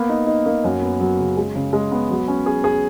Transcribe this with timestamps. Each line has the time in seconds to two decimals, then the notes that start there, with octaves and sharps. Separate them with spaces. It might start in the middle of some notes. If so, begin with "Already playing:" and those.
Already playing: A#3 B3
0.09 D#4
0.27 D#4
0.46 A#3
0.64 F#2
0.82 B3
1.00 F#3
1.19 C#3
1.37 G#3
1.55 C#3
1.73 G#3
1.92 B3
2.10 F#3
2.28 C#4
2.46 G#4
2.64 G#4